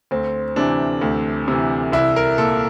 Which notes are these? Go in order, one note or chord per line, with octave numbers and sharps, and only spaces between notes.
D2 C4
C3 E3 D4
D2
C3 E3
C2 E4
A#4
A#2 A4